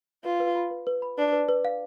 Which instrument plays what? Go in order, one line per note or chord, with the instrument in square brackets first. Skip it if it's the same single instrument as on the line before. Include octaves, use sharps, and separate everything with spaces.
[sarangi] F4 [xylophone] B4
[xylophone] B4
B5
B4
B4
B5
[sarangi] D4 [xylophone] B4
[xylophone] B4
B4
F5